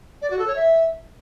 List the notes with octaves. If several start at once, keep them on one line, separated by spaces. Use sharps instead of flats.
D5
F#4
A4
C#5
E5